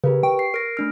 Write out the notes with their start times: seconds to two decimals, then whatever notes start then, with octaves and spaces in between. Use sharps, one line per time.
0.04 C#3 G4 A#4 B4
0.23 G5 C#6
0.39 C7
0.54 A#4 A#6 D7
0.77 A3 D4 F6